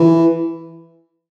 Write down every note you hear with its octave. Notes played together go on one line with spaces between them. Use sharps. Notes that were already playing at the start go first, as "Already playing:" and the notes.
Already playing: E3